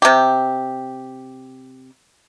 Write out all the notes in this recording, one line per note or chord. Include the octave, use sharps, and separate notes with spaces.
C3 G4